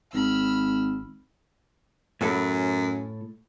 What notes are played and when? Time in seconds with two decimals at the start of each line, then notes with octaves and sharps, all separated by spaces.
0.14 G#1 B5 E6 F6
2.21 F#2 A2 A4 B5